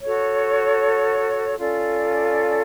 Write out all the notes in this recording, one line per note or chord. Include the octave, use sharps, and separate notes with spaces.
F#4 A4 C#5
C#4 F4 A4 D5